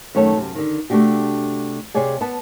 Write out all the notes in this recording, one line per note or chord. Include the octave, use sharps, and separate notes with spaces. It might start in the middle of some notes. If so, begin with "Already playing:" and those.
F#2 D#3 A3 A4 C#5 A5
F#2 C3
D3 D#3
C3 A3 A#3 D4 F#4 G4
C3 G#4 C#5 D5 G#5
B3 B4 A5